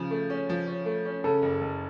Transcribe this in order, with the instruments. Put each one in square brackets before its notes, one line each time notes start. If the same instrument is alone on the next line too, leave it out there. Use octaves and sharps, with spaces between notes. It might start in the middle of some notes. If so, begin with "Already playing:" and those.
Already playing: [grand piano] C#3 F3 [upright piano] G#4
[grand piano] A3
C#4
F3
C#4
A3
C#4
[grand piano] C#3 [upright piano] A4
[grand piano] F#1
F#1